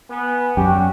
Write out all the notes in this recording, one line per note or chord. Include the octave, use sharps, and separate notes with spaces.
B3 G#5
F#2 G3 F#4 G4